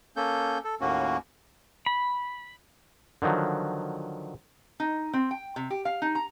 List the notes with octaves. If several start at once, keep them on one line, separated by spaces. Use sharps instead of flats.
A#3 C#4 A4 G6
A4
D#2 A2 A#3 C#4 F#4
B5
D3 D#3 F3 F#3
D#4
C4
G5
C3
G4
F5
D#4
A#5